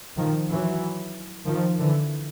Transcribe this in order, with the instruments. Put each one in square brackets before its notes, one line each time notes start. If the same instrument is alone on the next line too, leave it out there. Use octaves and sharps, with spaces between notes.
[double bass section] D#3 F3
E3 F#3
D#3 F3
D3 E3